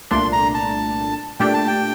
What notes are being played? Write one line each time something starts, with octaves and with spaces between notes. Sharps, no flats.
C2 A#2 A3 D4 C6
A#5
A5
A#2 A3 D4 G4 G5
A5
G5